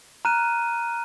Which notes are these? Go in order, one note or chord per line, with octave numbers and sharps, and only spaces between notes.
A#5 F6 F#6 D#7